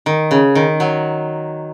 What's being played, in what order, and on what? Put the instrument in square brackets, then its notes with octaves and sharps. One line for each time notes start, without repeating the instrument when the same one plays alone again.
[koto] D#3
C#3
D#3
F#3